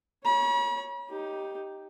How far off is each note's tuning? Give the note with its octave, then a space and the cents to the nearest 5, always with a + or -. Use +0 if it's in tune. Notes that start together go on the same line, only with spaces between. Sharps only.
C#5 +0 B5 -45
D#4 +5 G4 +0